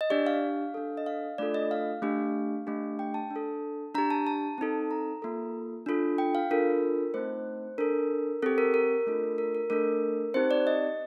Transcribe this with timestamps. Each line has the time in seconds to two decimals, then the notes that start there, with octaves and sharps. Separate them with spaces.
0.01 D#5
0.10 D4 G4 D5
0.27 F5
0.74 D4 A4
0.97 D#5
1.06 F5
1.38 A3 D4 F4 A4 D5
1.54 D#5
1.71 F5
2.02 A3 D4 G4
2.67 A3 D4 G4
2.99 G5
3.14 A5
3.31 D4
3.36 A4
3.95 D4 G4 A#5
4.11 A5
4.27 A5
4.58 C4 D#4 A4
4.91 A#5
5.22 A#3 F4 A4
5.86 D4 F4 A4
6.18 G5
6.35 F5
6.51 D4 F4 A4 A#4
7.14 A3 C4 D#4 C5
7.78 D4 A4 A#4
8.42 C4 G4 A4
8.58 A#4
8.74 A#4
9.07 A3 D4 F4 A4
9.38 A#4
9.55 A#4
9.70 A3 D4 A4 A#4
10.34 C4 D#4 G4 C5
10.51 D5
10.67 D#5